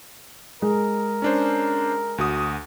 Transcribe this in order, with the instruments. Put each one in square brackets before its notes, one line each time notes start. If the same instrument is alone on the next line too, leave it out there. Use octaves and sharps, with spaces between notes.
[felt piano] G#3 [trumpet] A#4
[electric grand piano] C#4 D4 C5
D2 F#4 D#6